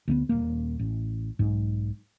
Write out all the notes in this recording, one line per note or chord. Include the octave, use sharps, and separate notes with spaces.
D2 A3 B3
D#1 A#3
A1
B1 G#2